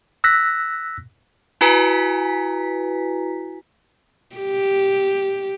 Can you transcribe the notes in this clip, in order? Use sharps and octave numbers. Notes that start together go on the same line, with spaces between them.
E6 F#6 A#6 B6
E4 F#4 B4 G#5 A#5 B6
G4